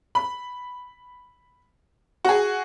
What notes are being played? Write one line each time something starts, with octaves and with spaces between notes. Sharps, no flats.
B5
F#4 G#4